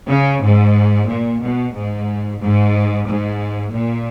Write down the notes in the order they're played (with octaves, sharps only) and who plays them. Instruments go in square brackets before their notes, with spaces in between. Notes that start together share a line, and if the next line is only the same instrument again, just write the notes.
[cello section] C#3
G#2
A#2
B2
G#2
G#2
G#2
A#2